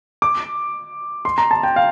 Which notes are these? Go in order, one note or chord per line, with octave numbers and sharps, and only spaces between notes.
D6
C6
A#5
A5
G5
F5